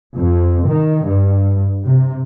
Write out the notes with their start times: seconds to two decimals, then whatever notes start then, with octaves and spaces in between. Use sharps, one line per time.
0.15 F2
0.66 D#3
1.07 G2
1.85 C3